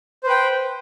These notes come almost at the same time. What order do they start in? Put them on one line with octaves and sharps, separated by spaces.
C5 B4 G5